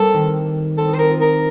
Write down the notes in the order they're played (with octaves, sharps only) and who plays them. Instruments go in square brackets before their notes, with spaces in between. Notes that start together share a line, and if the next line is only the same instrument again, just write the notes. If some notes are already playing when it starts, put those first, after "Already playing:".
Already playing: [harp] G3 A#3 C4 [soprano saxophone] A4
[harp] D#3
[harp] C4 [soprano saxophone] A4
[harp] D#4
[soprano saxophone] C5
[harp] D#4 [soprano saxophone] A#4
[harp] F4
[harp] D#4 [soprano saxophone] A#4